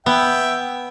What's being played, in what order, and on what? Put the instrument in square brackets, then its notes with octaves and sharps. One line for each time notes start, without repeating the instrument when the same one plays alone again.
[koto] B3 [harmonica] E5 G5